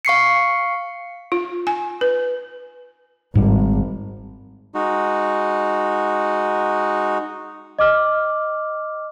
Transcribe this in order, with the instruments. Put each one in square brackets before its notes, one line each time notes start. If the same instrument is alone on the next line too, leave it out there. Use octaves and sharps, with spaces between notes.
[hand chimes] F5 C#6 C7 C#7
[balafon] F4
G#5
B4
[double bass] G#1 [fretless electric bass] G#2 G3
[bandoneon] G#3 D#4 F#4
[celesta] D#5 D6 F6